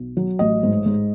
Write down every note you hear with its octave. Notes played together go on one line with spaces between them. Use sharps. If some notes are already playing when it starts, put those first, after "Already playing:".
Already playing: B1
F#3
A1 D#5
G#2
G#2